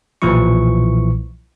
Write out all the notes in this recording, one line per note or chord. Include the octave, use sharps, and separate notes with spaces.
B1 A#2 E3 F3 E4 C#6